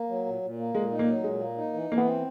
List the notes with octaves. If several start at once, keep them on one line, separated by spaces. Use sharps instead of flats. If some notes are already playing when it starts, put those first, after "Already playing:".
Already playing: A#3
F#3
A#2
A#2
A#3
A#2 G#3
D#4
A#3
F#3
A#2 G#3
A#3
D#4
E3
E3 A#3
B3
C4